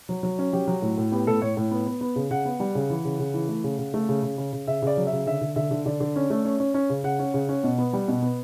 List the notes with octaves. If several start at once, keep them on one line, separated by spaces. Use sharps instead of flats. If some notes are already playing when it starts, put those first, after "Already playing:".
F#3
F#3
C#4
F#3 G4
F#3
A2 F#4
A2
B3 G4
A2 A4
A2 C#5
A2
B3
B3
B3
C#3
C#3 F#5
B3
G3
C#3
E3
C#3
C#3
E3
A3
C#3
C#3
A3
C#3
C#3
C#3
C#3
C#3 E5
C#3 D5
F#3
E5
C#3
D3 E5
D3
D3 E5
D3
D3 D5
D3
C#4
A3
C#4
C#4
C#4
C#3
C#3 F#5
C#4
C#3
C#4
B2
B3
G3
B2
B3